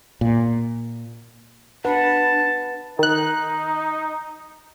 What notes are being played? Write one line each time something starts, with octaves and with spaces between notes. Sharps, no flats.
A#2
D4 B4 F#5 A5
D#3 D#4 F#6